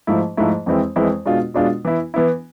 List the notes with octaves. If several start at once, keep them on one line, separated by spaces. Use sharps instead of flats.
G#2 F3 A3 E4
G#2 F3 A3 E4
F2 E3 G#3 C4 E4
F2 E3 G#3 C4 E4
B2 G#3 D4 F4
B2 G#3 D4 F4
E3 B3 E4
E3 B3 E4